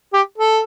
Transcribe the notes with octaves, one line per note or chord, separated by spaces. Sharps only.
G4
A4